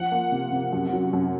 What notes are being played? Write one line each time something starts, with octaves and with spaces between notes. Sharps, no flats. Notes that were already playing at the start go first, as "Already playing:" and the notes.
Already playing: F3 F#5
A#3
C3
C3
F#2
F#3
F#2